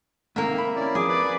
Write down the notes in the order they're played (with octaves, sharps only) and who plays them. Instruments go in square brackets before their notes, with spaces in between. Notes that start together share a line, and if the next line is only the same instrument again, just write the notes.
[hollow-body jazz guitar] G#2 C3 D#3 [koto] A#3 E5
[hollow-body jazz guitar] B5
[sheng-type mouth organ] C#4 E4 D5
[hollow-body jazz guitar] F2 [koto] G#4 [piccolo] D6
[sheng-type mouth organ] B4 D5 B5